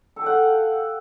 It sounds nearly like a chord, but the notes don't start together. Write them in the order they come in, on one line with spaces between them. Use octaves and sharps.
A4 G4 F#5 F5